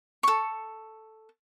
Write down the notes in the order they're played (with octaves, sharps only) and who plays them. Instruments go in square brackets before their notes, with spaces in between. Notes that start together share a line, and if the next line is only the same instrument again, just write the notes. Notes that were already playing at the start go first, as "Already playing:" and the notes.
[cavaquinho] A4 C#6